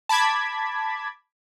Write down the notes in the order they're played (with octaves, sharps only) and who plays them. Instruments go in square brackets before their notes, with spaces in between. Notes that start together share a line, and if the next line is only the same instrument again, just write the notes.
[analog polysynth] A5 B5 D6 G#6 B6